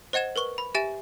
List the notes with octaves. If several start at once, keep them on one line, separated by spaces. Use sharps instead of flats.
C5 D#5 F#5 G#6 E7
A#4 B4 C#6 G7
B5
G4 E5 G#5 A6 E7